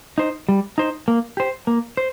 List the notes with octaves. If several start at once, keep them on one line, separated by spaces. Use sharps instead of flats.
D#4 C5
G3
D#4 C5
A#3
G4 C5
A#3
C5